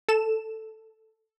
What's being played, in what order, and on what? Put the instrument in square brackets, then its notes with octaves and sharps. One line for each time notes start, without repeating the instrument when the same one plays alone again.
[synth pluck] A4 E7